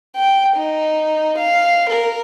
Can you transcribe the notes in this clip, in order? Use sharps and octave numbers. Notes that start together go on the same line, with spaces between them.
G5
D#4
F5
A#4